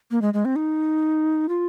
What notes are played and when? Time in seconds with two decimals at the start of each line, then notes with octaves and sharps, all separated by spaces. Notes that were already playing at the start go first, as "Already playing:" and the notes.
0.11 A#3
0.22 G#3
0.34 G#3
0.45 C4
0.56 D#4
1.49 F4